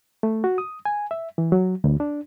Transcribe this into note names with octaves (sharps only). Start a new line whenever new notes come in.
A3
F#4
D#6
G#5
E5
E3
F#3
D2
D4